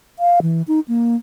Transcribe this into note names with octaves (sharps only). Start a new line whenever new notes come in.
F5
E3
D#4
A#3